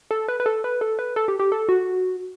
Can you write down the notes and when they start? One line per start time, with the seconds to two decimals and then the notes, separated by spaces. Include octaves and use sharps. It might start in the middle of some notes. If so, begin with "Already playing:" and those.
0.11 A4
0.28 B4
0.40 B4
0.46 A4
0.64 B4
0.81 A4
0.99 B4
1.16 A4
1.28 G4
1.40 G4
1.52 A4
1.69 F#4